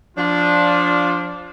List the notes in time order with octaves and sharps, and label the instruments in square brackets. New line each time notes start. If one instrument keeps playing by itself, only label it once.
[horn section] F3 D4 F4